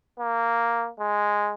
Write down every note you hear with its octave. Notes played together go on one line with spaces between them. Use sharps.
A#3
G#3